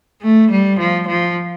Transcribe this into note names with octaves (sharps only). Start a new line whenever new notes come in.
A3
G3
F3
F3